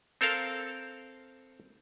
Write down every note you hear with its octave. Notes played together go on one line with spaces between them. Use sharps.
C4 A4 A#4 F5